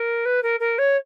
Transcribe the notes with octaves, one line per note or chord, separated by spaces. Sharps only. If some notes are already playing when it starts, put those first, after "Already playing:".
Already playing: A#4
B4
A#4
A#4
C#5